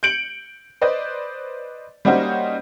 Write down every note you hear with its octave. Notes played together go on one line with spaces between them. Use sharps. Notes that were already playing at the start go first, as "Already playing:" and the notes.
G6 C#7 D7 F#7
B4 C5 D5 D#5
G3 A#3 C#4 D#4 F#4 C5